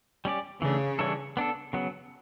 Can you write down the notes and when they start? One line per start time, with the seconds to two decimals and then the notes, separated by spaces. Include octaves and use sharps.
0.25 G3 C#4 G4 D5
0.62 C#3 E3 A3 D4
0.99 E3 G3 D4 A4 C#5
1.37 B3 D4 A4
1.73 C#3 F#3 B3